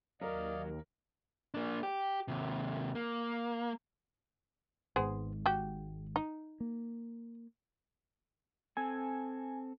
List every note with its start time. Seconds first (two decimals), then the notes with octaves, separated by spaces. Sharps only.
0.21 D#2 F#3 A#4 D5 D#5 F5
1.54 A#3 D4
1.83 G4
2.28 D#2 C3
2.95 A#3
4.96 G#1 G#2 B3 G#4 C5
5.46 F#4 G4
6.16 D#4
6.60 A#3
8.77 C4 A4 G#5